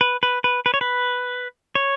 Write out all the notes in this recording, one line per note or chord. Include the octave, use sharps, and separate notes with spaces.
B4
B4
B4
B4
C#5
B4
C#5